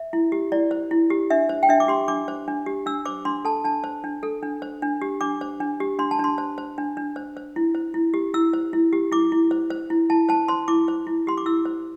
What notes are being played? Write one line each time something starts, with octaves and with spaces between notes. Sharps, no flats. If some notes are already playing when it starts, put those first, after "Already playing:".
Already playing: E5
E4
G4
E4 D5
C5
E4
G4
D4 E5
C5
G5
D4 E5
D6
G4 C6
D4 D6
C5
D4
G4
D4 E6
C5 D6
D4 C6
A4 A5
D4 A5
C5
D4
A4
D4
C5
D4
G4
D4 D6
C5
D4
G4
D4 C6
A5
D4 C6
C5
C5
D4
D4
C5
C5
E4
C5
E4
G4
E4 E6
C5
E4
G4
E4 D6
E4
C5
C5
E4
E4 A5
C5 A5
C5 C6
E4 D6
C5
E4
G4 C6
D6
E4 E6
C5